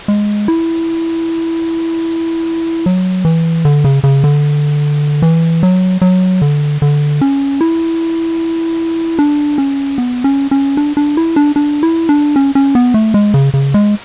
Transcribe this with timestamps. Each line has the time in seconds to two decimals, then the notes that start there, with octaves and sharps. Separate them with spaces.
0.08 G#3
0.48 E4
2.86 F#3
3.25 E3
3.65 D3
3.84 C#3
4.04 C#3
4.24 D3
5.22 E3
5.63 F#3
6.02 F#3
6.42 D3
6.82 D3
7.21 C#4
7.61 E4
9.19 D4
9.58 C#4
9.98 B3
10.24 C#4
10.51 C#4
10.77 D4
10.97 D4
11.17 E4
11.36 D4
11.56 D4
11.83 E4
12.09 D4
12.36 C#4
12.55 C#4
12.75 B3
12.94 A3
13.14 G#3
13.34 C#3
13.54 C#3
13.74 G#3